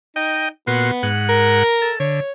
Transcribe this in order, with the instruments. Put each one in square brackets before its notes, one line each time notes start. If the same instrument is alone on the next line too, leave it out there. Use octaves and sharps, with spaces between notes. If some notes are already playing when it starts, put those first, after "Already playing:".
[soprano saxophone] D#4 [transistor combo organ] D#5 G5
[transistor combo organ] A#2 F#4 C6 [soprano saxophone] B3
[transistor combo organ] G#2 F#5
[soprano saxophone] A#4
[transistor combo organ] A4
[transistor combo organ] D3 [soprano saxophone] C#5